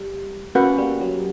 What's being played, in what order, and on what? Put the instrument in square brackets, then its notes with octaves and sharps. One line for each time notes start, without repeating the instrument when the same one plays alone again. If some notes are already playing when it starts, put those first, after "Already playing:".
Already playing: [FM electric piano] G3
[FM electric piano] A#3 [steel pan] C#4 F#4 B4 F#5
[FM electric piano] G3
F#3